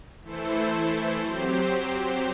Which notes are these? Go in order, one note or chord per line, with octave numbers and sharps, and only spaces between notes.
E3 A3 E4 A4 C5
F#3 C4 G4 C5